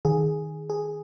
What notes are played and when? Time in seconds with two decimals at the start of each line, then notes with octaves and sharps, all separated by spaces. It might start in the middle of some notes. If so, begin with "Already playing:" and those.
0.05 D#3 G#4
0.70 G#4